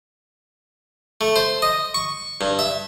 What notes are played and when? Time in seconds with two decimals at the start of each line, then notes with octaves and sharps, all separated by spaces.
1.21 A3
1.36 C5
1.62 D#5
1.94 C#6
2.41 G2
2.59 E5